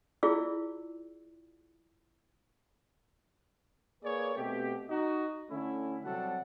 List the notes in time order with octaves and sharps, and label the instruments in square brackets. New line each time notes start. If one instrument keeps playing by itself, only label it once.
[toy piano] E4 F4 G#4 D5 E6
[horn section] A#3 G#4 B4 C#5 D5
B2 A3 C4 G4
D#4 F#4 D#5
D3 A3 C#4 E4
C3 F#3 G3 D4 A4 F#5